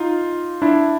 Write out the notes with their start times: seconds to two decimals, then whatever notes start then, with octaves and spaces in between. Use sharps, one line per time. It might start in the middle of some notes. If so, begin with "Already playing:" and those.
Already playing: D#4 F4
0.62 D4 E4